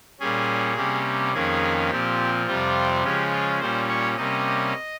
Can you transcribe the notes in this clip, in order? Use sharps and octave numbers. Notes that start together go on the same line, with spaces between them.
A#2 G3 C#4 G#4
C3 G3 A#3 C#4
F2 D#3 A#3 C#4 G#4
A#2 F3 C4 G4
F2 C3 G3 C4 F4
C#3 F3 G#3 C#4 G4
F4
A#2 G3 C#4 C5
C#5
C3 G3 A#3 C#4 D#5